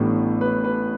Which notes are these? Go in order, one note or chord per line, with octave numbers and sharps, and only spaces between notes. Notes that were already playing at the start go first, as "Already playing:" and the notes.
Already playing: A1 A2 G3 B3 D4 A4
B4
B4